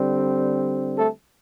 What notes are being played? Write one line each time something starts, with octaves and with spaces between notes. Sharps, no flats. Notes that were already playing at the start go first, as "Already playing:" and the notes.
Already playing: D3 G3 C4
A3 A4